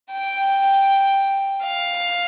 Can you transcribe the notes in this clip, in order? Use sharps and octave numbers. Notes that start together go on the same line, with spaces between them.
G5
F5